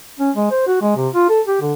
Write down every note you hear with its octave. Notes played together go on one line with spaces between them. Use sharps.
C#4
G#3
C5
F#4
G#3
C3
F4
A4
G4
D3